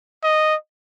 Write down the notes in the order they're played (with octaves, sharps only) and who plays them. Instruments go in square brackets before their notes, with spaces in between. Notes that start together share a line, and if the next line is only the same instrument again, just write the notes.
[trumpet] D#5